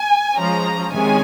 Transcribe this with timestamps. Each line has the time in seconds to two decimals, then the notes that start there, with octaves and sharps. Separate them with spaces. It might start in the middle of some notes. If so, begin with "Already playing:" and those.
Already playing: G#5
0.35 F3 G#3 C#4 A#5
0.92 C3 D#3 G#3 C#4 G#5